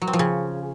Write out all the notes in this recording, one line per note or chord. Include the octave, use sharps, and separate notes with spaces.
F#3
C4
F3
C#3